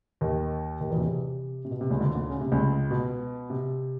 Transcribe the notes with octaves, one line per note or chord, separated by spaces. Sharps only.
D#2 D#3
D#2 D#3
E2 E3
B2
C3
C3
B2
C3
C#2 C#3
D2 D3
D2 D3
C#3
C3
C#2 C#3
B2
C3